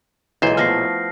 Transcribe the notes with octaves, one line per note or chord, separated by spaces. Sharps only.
B1 A#2 E3 G#3 C5
F3 A3 B3 F6 A#6 C7